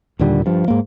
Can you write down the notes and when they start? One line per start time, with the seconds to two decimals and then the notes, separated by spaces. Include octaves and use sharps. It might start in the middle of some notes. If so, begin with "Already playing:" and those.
0.19 D#2 A#2 D3 G3
0.46 G2 F3
0.68 G#2 A#3